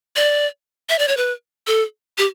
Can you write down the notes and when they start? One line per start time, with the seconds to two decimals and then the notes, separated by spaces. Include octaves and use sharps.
0.16 D5
0.89 E5
0.99 D5
1.08 C#5
1.17 B4
1.67 A4
2.18 G4